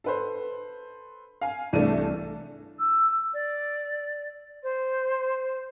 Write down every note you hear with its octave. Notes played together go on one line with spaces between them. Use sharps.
A4 B4 C5
F5 G#5
C2 E3 A3 D4 D#7
E6
D5
C5